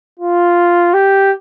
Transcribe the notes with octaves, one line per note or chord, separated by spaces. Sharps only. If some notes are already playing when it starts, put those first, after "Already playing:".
F4
G4